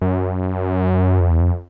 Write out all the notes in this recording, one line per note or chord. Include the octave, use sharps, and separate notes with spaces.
F#2
F2
E2
F2